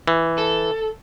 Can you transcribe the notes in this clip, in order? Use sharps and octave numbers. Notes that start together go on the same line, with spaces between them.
E3
A4